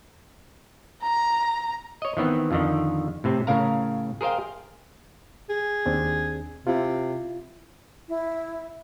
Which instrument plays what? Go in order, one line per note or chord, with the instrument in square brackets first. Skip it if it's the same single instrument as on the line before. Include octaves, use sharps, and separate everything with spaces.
[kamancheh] A#5
[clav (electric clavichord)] C#5 D#5
D#3 E3 B3 C4
F2 D3 D#3
A2 C3 C4
A2 C#3 A#4 F5 A#5
G#4 A#4 C5 F5 G5
[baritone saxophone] G#4
[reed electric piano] D#2 C4 D4
[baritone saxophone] C3 [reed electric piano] E4 F4
[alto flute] E4